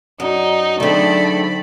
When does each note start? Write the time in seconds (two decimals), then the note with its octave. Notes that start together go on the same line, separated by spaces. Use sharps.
0.20 F#2 D#4 D5
0.80 D3 F#3 A3 C4 D#4 G#4 D5 B5